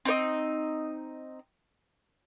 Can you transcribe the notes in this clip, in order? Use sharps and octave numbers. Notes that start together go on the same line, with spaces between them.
C4 D#4 C5 D#5